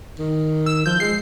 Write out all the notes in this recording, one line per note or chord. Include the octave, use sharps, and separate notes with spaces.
D#3
E6
F3 G6
G#3 C7